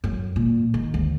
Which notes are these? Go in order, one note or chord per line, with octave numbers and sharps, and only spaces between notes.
F#2
A#2
D#3
D2